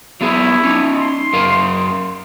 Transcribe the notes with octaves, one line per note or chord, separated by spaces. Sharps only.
F#3 B3 E4 G#4
C#4 D#4
C6
F#2 A#4 F5